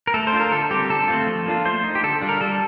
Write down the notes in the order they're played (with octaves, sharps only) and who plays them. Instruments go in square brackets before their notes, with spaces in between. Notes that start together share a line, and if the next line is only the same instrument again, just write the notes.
[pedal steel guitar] A#4
A3 A4
C5
D4 F4
A#4
D3 A4
G3 C4 G4
D3 A4
A3 C4 F4
F3
A#3 D4 F4
A3 C5
D#4
G4
D3 A4
G3 D4 F4
A#4
G3 A4